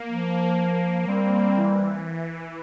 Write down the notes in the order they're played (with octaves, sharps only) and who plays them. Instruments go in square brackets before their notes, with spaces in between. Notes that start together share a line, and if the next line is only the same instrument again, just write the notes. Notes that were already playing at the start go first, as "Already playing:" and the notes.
Already playing: [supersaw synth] A#3
[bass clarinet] F3
[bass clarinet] G3 [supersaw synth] C4
[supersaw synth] E3